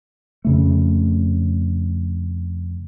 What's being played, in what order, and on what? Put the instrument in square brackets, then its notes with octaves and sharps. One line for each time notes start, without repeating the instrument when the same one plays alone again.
[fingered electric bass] F2 C#3 A3